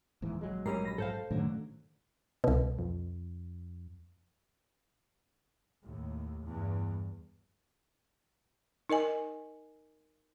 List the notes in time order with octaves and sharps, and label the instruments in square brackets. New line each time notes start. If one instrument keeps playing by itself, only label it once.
[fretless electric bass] D#1 G#2 E3
A#1 F#3 G#3
[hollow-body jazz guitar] G#2 G3 C#4 [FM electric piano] A#4 A#5 C7
[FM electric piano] B5 A#6
[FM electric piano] G#2 [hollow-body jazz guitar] A4 C5 F5
[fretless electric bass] F#2 D3 F#3 [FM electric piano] A2 D#3 A3
[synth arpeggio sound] C2 B2
[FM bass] F2
[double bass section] D#2 A2
E2 G2
[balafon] D#4 A#4 D#5 G#5